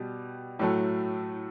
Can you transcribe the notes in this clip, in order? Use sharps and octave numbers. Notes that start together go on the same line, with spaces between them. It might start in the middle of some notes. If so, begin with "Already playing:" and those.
Already playing: B2 G3
A2 F#3 A3